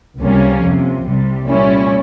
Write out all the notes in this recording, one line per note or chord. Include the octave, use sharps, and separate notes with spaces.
C#2 C3 G3 A#3 C#4
F2 C3 F3
C2 C3 G3
A#2 G3 C#4 E4